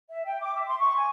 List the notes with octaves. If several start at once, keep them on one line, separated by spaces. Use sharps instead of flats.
E5
G5
D6
E5
C6
C#6
G#5